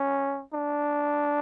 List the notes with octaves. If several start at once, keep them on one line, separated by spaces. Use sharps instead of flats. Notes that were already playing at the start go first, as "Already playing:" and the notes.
Already playing: C#4
D4